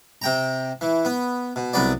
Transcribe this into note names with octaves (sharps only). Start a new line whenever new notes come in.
C3 G5 A#5
E3
B3
B2
C2 F#3 B3 D5